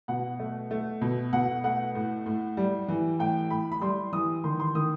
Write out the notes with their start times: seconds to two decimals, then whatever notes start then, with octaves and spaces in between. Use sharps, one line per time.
0.08 B2 F#5
0.39 A3
0.71 A3
1.01 B2
1.33 B2 F#5
1.64 A3 F#5
1.95 A2
2.26 A2
2.57 G3
2.88 E3
3.19 A2 G5
3.50 A2 B5
3.72 B5
3.81 G3 C6
4.13 E3 D#6
4.44 D#3 C6
4.60 C6
4.75 D#3 D#6